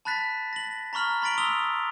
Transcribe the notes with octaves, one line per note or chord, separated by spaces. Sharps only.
A5 B5 F#6 A6 B6
A#6 F#7
A#5 B5 C#6 F6 F#7
B5 C6 A6 B6 D7 F#7
D#6 E6 F7 G7